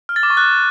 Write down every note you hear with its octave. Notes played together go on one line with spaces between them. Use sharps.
F6
A6
D6
C#6
F#6